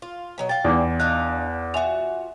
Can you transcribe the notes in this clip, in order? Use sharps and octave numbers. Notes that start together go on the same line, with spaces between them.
F4
B2 F#3 D#5
F5 G5 A6
E2 D#4 D5 D6
D4 D#5 F5 F#6
F4 F#4 E5 G#5 F7